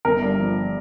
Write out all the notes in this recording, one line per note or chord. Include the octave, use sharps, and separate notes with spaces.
G1 A#4
G2
F3